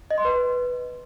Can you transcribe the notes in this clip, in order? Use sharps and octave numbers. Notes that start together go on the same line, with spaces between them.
D#5
C6
B4